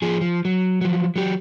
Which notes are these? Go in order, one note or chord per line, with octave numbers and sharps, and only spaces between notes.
F3 G#4
F3
F#3
F3 F#3
F#3 G4